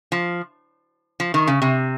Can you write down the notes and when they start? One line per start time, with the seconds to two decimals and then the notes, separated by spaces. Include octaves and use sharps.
0.12 F3
1.20 F3
1.34 D#3
1.47 C#3
1.62 C3